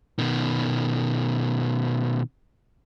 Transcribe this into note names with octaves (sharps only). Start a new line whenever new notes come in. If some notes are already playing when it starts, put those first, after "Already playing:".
B2 D#3